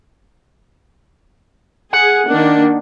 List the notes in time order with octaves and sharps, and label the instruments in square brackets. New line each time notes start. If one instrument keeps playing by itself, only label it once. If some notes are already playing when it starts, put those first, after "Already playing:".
[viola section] G#4 [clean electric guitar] F#5
[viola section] D#3 A#3 D4